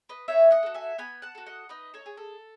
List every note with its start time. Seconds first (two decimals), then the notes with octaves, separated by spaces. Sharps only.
0.09 B4 D#5
0.28 D#4 C#5 E5
0.51 D#5 F#5
0.63 F#4 A4
0.74 E5 G#5
0.98 B3 G#5 B5
1.22 F#5 A5
1.35 F#4 A4
1.46 D#5 F#5
1.69 D#4 B4 D#5
1.94 A4 C#5
2.06 G#4
2.17 A4